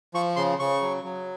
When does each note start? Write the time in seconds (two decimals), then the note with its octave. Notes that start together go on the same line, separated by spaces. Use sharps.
0.14 F3 C#6
0.36 C#3 C6
0.59 C#3 C#6
0.81 F#3
1.04 F#3